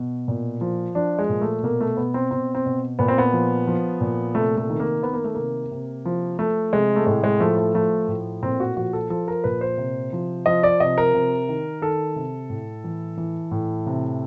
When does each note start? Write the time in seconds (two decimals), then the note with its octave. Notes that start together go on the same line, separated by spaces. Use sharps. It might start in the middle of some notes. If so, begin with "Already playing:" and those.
Already playing: B2
0.28 A#2
0.61 F3
0.95 F3 D4
1.19 G#3
1.29 A#2
1.41 A3
1.63 B2 A#3
1.80 A3
1.97 B2 B3
2.14 C4
2.31 B2 C4
2.55 C4
2.66 B2
2.99 A#2 B3
3.08 C4
3.18 B3
3.33 F3
3.67 F3
4.01 A#2
4.35 C3 A3
4.57 A3
4.69 D#3
4.80 A#3
5.02 D#3 B3
5.13 A#3
5.24 A3
5.35 C3 A#3
5.71 C3
6.05 F3
6.38 F3 A3
6.73 C3 G#3
6.96 A3
7.06 A2 G#3
7.24 G#3
7.40 F3 A3
7.57 A3
7.74 F3 A3
8.08 A2
8.42 A#2 C4
8.60 F#4
8.77 F3 F#4
8.93 A4
9.10 F3 A4
9.28 A#4
9.44 A#2 B4
9.61 C5
9.78 C3
10.13 F3
10.46 F3 D#5
10.63 D5
10.80 C3 D#5
10.98 A#4
11.14 C3
11.49 D#3
11.82 D#3 A4
12.16 C3
12.50 A2
12.84 E3
13.17 E3
13.51 A2
13.86 C3